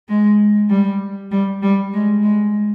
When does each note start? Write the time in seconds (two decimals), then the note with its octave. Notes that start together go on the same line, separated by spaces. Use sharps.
0.09 G#3
0.69 G3
1.31 G3
1.62 G3
1.93 G#3
2.23 G#3